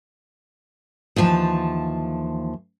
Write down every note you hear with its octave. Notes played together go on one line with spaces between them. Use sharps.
D#2 E3 F3 A5